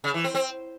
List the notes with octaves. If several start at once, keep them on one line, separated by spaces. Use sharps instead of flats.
C#3
E3
C4
C4